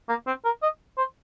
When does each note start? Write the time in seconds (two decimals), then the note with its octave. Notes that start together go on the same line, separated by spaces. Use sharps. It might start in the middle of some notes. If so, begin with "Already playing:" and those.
0.09 A#3
0.27 C4
0.45 A#4
0.63 D#5
0.98 C5